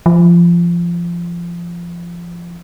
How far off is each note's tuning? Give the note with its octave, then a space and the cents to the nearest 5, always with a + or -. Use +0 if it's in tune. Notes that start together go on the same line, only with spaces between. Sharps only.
F3 -20